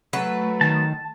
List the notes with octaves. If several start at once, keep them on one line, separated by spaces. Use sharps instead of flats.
F#3 A3 B4
D#3 A5